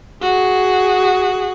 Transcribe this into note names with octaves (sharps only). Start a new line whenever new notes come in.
F#4 G#4